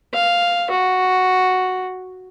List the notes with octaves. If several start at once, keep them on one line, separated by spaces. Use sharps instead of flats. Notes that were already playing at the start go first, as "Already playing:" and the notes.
F5
F#4